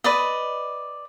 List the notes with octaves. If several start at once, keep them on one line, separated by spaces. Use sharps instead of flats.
B4 D5 D#5